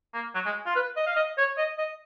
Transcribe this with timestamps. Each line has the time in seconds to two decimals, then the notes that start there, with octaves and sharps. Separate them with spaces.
0.14 A#3
0.35 F#3
0.45 G#3
0.66 F4
0.76 B4
0.97 D#5
1.06 F5
1.16 D#5
1.38 C#5
1.57 D#5
1.78 D#5